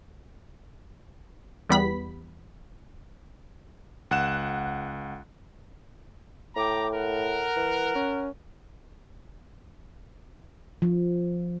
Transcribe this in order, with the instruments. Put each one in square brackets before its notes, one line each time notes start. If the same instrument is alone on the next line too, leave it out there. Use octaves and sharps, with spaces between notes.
[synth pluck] E2 G3 B3 B5 B6
[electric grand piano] C#2 F#5 F#6 E7
[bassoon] A2 [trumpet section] G5 A#5 D6
[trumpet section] A#4 F#5
[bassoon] E3
C#4
[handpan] F3